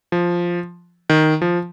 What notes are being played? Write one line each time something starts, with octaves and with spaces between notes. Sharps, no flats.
F3
D#3
F3